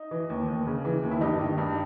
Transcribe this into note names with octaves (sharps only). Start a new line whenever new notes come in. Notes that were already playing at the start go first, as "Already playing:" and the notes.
Already playing: D#4
E3
D#2
D#2
C#3
E3
D#2
E4
G2 D#4 G4
D#3
G2